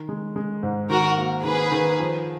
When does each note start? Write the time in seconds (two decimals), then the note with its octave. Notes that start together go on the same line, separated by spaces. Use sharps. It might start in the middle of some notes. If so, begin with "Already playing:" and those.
Already playing: D#3
0.09 G#3
0.36 G#3
0.63 G#2
0.90 D#3 F#4 A#4
1.18 A#3
1.44 D#3 G#4 B4
1.72 D#3
2.00 F3